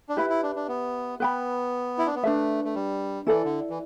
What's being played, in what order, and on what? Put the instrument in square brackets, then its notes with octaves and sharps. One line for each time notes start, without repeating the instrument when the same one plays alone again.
[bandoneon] D4
[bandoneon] E4 [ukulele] G4 B4 E5 B5
[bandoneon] E4
D4
D4
B3
[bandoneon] B3 [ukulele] B4 G5 B5
[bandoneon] E4
D4
B3
[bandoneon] A3 [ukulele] D4 B4 E5
[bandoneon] A3
G3
[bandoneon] E3 [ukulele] E4 A4 D5
[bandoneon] D3
E3